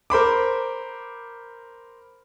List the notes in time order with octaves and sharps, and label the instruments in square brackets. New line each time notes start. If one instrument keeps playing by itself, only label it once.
[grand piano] A#4 C5 B5 D6